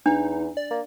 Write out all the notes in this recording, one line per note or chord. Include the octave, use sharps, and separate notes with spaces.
E2 D4 D#4
D5
A#3